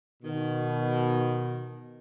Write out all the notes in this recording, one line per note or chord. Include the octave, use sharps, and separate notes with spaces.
B2 D#3